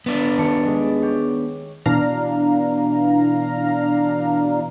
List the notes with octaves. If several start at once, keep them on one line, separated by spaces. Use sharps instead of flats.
B3 D4
D#1 A5 C#7
G#3 D#5
C#5 G5 D6
B2 E3 D4 F5 A#5